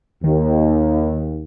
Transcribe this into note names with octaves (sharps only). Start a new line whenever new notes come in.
D#2 D#3